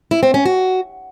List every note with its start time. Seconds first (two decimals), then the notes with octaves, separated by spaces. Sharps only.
0.11 E4
0.23 C4
0.34 C#4
0.45 F#4